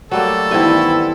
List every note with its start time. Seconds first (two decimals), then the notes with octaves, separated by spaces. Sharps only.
0.11 F#3 G3 A3 A#3 A4
0.51 G2 D#3 E3 B3 C4 E4 G#5